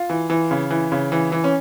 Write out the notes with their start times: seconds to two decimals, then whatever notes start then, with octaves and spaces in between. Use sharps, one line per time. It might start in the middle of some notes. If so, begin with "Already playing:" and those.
Already playing: F4
0.10 E3
0.30 E3
0.51 C#3
0.71 E3
0.92 C#3
1.12 E3
1.32 E3
1.44 C#4